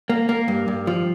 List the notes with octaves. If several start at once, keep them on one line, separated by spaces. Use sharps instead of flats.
A#3
A#3
G2
G2
F3